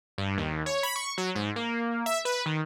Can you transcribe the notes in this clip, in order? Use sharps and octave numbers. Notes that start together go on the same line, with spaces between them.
G2
D#2
C#5
B5
C#6
F#3
G#2
A#3
E5
B4
D#3